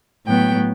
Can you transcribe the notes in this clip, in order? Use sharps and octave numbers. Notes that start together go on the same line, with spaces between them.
A2 F#3 B3 G5